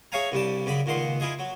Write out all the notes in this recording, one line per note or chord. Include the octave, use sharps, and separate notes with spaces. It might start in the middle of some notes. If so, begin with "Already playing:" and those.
G#4 C#5 E5 F5 G#5 A#5
C2 G2 G3 A5
F#2 C#3 D5 B5
C#2 A#2 D#3 F#5 C6
E4 F4 G#4 D#5
F#3